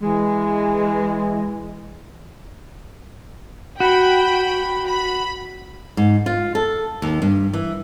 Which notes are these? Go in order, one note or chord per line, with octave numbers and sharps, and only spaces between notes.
E3 G#3
F#4 G5 B5
B5
G#2
F4
A4
D#2
G2
E3